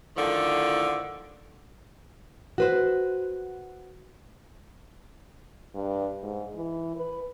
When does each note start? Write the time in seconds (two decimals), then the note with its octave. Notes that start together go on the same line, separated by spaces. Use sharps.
0.17 A2 D3 D#3 F3
2.58 F#4 B4 C5
5.75 G2
6.23 G#2
6.55 E3
6.96 B4